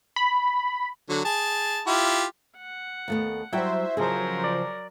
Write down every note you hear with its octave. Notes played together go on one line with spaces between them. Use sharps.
B5
D3 F#3
G#4 A5
E4 F4 G4
F#5
D#2 A3 B3
F#3 G3 E4 F#4 C5 E5 G5
C#3 F3 F#3 G#4 A#4 C5 D#5
D5